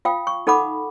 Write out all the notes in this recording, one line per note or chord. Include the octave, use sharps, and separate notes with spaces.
F4 F5 G5 D#6
C#6
D#4 A4 F#5 B5 D6